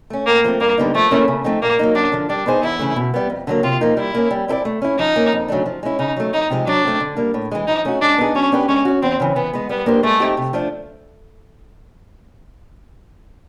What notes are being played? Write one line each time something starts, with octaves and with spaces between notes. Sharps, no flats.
A3 C#4
A2 A#3
F3 A3 C4
G2 A#3
D3 G3 B3 D#4
F3 A3
A#3 C#4 E4 A4
C#3
F3 A3 C4 D#4
A#2 A#3
F#3 A#3 D#4
F#2 D4
D3 F3
G3 D4
B3 D#4 G#4 C5
E2 E4
C#3 E3 A3
B2
G3 B3
F2
D3 F#3 A#3
C3 F4
F3 A#3 D#4
G3 E4
A#3 C#4
G3
C4 E4 A4 D5
A3
C#4 E4
F3 D#4
A#3 C#4
F2
C#3 F#3 A3 D4
F3
G#3 C#4 E4
C#3 D#4
F#3 A3
F2 D#4
C3 F3 G#3
F#3 D4
A3 C4
D3
G3 A#3
A2
E3 G#3
F3 D#4
A3 C#4 F#4
G#3 D4
B3 D#4 G#4
F#3 C#4
B3 D4 G4 B4
G#3 C#4
C#4 F#4
E2 C4
C#3 E3
E3 B3
G#3 B3
G3 B3
A#3 D4 G4 C5
G#3 A3
C4 D#4 G4
C3
F3 A3 D4